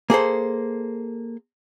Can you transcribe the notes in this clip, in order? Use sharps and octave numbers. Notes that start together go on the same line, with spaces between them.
A#3 G#4 A4 C5